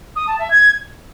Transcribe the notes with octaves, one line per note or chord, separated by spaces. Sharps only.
D#6
A5
E5
G#6